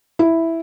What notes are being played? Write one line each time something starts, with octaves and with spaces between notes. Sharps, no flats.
E4